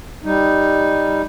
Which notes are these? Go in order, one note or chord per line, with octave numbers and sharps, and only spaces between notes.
G3 D#4